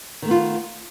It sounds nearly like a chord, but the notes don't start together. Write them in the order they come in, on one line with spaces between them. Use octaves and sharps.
D#3 A3 B3 F4